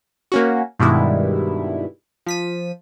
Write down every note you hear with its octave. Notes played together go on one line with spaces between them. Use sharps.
A#3 C#4 F#4
G2 B2 D#3 G3 G#3 E4
F3 B6 D#7